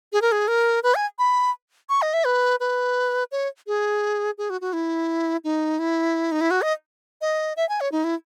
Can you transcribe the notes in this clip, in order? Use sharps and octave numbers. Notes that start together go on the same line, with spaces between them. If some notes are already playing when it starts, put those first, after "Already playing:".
G#4
A#4
G#4
A#4
B4
G#5
B5
C#6
D#5
E5
B4
B4
C#5
G#4
G#4
F#4
F#4
E4
D#4
E4
D#4
E4
F#4
D#5
D#5
E5
G#5
C#5
D#4
E4